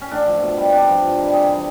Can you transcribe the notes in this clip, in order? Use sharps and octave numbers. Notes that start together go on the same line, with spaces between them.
C#4
A2 D4
F3
B2
G3
C3 D4
F3
G2
D#3 G3
C3 G#4
E3 G3